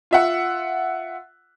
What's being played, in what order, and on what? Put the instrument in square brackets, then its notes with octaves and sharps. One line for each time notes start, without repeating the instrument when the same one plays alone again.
[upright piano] F4 E5 F#5